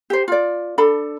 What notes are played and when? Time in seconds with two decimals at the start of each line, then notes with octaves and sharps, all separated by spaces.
0.10 G4 C5
0.28 F4 D5
0.78 D4 A4 B5